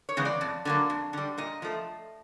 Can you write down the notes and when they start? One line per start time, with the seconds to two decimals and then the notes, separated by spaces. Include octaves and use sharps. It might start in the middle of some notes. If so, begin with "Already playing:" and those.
0.09 C#5
0.17 C#3 E3 G#3 B3
0.25 D5
0.41 F2
0.65 D3 F#3 A#3
0.90 F2
1.13 D3 G3
1.38 A#2 D#5
1.62 F3 A3